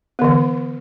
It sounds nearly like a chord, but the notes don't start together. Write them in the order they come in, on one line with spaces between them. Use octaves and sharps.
B3 D3 E3